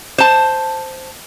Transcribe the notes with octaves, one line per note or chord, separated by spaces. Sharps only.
C5 A5